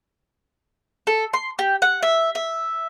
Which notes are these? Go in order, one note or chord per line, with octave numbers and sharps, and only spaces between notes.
A4
C6
G4
F#5
E5
E5